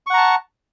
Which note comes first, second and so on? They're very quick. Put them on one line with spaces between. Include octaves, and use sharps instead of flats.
C#6 F#5 A#5 A5